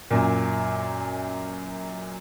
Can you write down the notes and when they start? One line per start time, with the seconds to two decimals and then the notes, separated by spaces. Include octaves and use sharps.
0.11 F#2 A#2